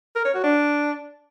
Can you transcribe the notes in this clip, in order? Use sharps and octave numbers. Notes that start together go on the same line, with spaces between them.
A#4
C#5
F#4
D4